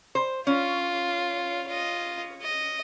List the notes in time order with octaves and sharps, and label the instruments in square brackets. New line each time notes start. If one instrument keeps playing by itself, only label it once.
[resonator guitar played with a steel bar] C5
[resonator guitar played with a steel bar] C#4 [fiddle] F4
[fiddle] F4 D#5
D#5